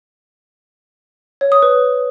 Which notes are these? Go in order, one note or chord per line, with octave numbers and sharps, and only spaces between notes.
C#5
D#6
B4